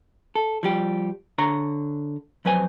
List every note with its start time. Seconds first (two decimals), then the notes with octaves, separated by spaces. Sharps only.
0.35 A4
0.63 F3 G3 G4
1.38 D3 C#5 A#5
2.45 F2 F#3 B4 C5 G#5